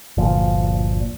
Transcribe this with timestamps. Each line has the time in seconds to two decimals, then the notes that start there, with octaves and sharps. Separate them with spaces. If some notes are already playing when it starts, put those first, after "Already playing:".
0.17 G1 D2 A#2 F3